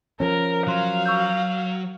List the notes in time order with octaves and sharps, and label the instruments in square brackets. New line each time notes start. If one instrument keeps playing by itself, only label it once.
[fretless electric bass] F3 C#4 [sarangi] A#4
[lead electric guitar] F#3 [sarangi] F5 [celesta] C6 F#6
[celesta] C#6 E6 G6